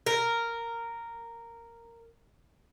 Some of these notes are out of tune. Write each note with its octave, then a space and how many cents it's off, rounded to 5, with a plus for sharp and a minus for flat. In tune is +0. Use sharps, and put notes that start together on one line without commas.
A#4 -10